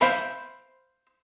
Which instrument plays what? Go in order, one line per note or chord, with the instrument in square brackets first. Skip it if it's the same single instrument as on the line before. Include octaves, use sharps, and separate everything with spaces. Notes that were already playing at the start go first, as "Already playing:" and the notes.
[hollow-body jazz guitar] C5 E5 F5 B5